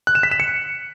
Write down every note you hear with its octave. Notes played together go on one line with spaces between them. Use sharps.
F#6
E7
B6
E7
C#7